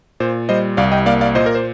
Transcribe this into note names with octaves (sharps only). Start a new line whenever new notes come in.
A#2 C5
G3 C5 D#5
C2 D5 F5
D#5 G5
A#3 D5 F5
D5 F5
A#2 C5 D#5
A#4
C5